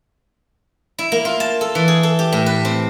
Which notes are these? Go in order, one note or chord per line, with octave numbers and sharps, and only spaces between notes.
E4
A#3
F4
A5
A4
E3
G#4
A4
G4
A2
B4
C4